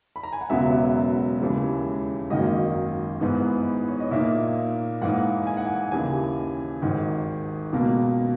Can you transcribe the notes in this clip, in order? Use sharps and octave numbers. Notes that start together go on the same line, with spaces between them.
B5
A#5
G#5
F#5
E1 E2 C#3 F#3 B3 E5
D#2 C#3 E3 G#3
G#1 F#2 D#3 A#3 D#5
G#2 E3 B3 D#4
C#5
D#5
A#2 A#3 D#4 E5
G#2 E3 A#3 D#4 F#5
G#5
F#5
G#5
D#2 C#3 E3 G#5
G#1 G#2 D#3
C#2 B2 A#3